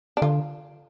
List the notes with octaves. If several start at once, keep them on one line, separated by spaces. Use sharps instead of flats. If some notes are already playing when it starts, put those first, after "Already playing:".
D4
D3 F4